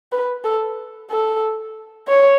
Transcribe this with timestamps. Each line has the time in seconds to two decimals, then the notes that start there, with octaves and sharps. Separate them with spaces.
0.12 B4
0.44 A4
1.10 A4
2.08 C#5